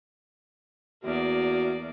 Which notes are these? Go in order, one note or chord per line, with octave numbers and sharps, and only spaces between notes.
E2 A#3 F#4 D5